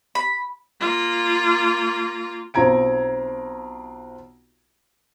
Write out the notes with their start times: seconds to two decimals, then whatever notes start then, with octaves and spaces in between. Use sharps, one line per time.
0.15 B5
0.80 A#3 F4
2.54 B1 C4 F4 A#5 G#6 D7